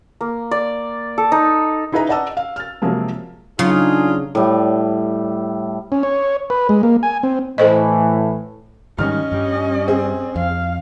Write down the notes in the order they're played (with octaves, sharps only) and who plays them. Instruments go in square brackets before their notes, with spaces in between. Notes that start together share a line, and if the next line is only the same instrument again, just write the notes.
[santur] A#3
D5
A4
D#4
[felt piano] D#4 E4 G#4 B4 D#5 A#5
D5 D#5 F#5 A5 E6
F5
F6 A6
C3 F3 F#3 G#3 A#3
[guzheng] C#3 [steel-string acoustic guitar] F#3 [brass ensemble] D4 D#4 G#4 [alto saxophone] F4
[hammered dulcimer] A2 G3
[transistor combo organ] C#4
C#5
B4
G#3
A#3
G#5
C4
[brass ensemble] A2 E3 [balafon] A4 C5 D#5
[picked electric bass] G#2 D#3 G3 [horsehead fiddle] C#4 D#5 [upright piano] F6
[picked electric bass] G2 G3
[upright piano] C4 G#4
[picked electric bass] F2 [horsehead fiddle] F5